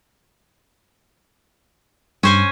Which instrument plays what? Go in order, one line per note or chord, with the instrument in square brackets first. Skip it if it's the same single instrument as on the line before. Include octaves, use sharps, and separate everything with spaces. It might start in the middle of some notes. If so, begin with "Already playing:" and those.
[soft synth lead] G2 [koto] C#4 C5 G#5